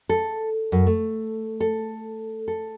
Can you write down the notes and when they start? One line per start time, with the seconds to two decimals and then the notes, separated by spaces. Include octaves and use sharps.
0.09 A4
0.72 F#2
0.87 A3
1.60 A4
2.48 A4